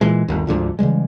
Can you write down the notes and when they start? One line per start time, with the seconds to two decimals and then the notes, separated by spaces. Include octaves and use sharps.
0.01 A#2 E3 G#3
0.28 G1 D#2
0.47 D2 G#2 D3 F3
0.79 C#3 E3 G3 G#3